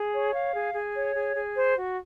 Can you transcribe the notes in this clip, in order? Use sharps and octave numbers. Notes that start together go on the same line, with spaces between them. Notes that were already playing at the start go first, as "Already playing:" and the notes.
Already playing: G#4
C#5
F5
G#4
G#4
C#5
G#4
G#4
C5
F#4